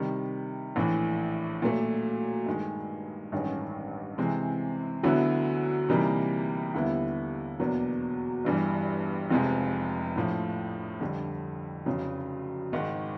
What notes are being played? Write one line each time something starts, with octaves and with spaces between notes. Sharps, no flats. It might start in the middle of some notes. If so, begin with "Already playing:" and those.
Already playing: C3 D#3 G3
A#1 A2 E3
A#2 F#3 A3
G2 D#3 G#3
A1 G2 D#3 G#3 C#4
C3 E3 G#3 C4
D2 D3 F#3 B3 E4
C3 E3 G3 A#3 D#4
D#2 D3 G3 B3 E4
E2 B2 F#3 A#3 D4
G1 G2 E3 G3
F1 F2 C3 F3 G#3
A#1 A2 F3
F2 D3 G3
F1 F2 C#3 F#3
G#1 G#2 D#3